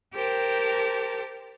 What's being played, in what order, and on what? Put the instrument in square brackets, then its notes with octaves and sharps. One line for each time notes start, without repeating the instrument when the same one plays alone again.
[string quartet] G4 A#4 C5 G5 A5